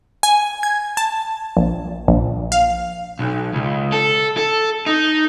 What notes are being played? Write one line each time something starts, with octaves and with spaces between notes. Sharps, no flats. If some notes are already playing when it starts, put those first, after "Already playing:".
G#5
G#6
A5
A#1
A#1
F5
B1
C#2
A4
A4
D#4